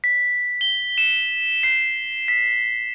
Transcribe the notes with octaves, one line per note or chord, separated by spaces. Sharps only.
B6
G7
E7
C7
B6